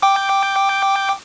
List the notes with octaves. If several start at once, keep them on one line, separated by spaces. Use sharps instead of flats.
G5 D6